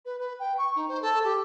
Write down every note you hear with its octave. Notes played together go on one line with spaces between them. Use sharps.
B4
B4
G5
C#6
D#4
C5
A4
G4